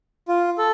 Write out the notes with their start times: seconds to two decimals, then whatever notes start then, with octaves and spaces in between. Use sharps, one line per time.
0.28 F4
0.58 A4